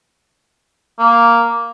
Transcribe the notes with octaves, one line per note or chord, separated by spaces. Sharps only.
A#3